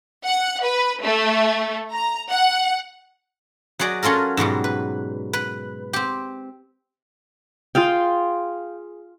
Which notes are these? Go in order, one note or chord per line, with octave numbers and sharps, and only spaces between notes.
F#5
B4
A3
A#5
F#5
F#3 F#4 G#4 D5 D#5
F#3 C#4 F4 A4 A#4
G#2 B2 F#3 G3
B4
B4
C4 G4
F4 G#4 F5 G5